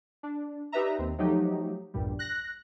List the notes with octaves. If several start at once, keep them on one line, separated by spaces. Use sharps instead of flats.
D4
D#4 G4 B4 D5 E5 A#5
D#2 C4
F3 F#3 A3 D#4 G4
A#1 E2 G2 A#2 G3
F#6 A#6